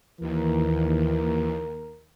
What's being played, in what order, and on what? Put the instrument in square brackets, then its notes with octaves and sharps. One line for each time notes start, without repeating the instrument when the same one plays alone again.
[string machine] D#2 [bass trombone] E3 [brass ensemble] A#4